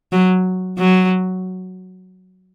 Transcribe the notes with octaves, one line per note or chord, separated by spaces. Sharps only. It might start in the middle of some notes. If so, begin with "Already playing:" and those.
F#3
F#3